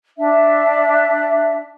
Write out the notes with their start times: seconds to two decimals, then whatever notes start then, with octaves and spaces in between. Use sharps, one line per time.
0.18 D4 E5